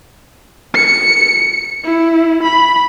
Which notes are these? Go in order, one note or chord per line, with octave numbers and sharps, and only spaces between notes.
C#7
E4
B5